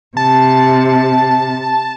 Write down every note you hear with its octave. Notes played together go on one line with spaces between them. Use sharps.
C3 A5